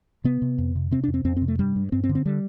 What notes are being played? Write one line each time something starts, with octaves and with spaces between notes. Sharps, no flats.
C3 B3
C3
F2
C3
C3 C4
D4
F2
C4
F2 C4
C4
C3
A3
G2 G3
G2
G2 C4
C4
D3
C4
D3 G3